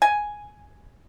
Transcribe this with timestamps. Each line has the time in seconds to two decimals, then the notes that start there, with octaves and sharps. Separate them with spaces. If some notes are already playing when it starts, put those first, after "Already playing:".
0.02 G#5